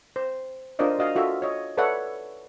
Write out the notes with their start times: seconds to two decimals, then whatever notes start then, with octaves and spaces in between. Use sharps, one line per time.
0.16 C5
0.79 D4 F4 A#4 C5 D5 D#5
0.99 F#4 D#5 F5
1.16 F4 F#4 A4 E5
1.42 C#5 D#5
1.77 A4 B4 C#5 D5 E5 F#5